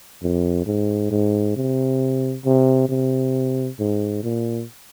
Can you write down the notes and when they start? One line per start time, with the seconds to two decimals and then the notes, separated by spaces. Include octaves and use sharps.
0.23 F2
0.66 G#2
1.11 G#2
1.56 C3
2.45 C3
2.89 C3
3.79 G#2
4.23 A#2